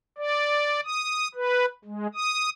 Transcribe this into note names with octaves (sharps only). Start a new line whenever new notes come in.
D5
D#6
B4
G#3
D#6